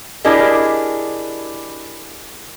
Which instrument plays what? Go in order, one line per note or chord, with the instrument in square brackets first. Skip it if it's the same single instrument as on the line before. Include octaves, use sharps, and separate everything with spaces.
[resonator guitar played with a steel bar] D4 E4 G4 G#4 A#4 D#5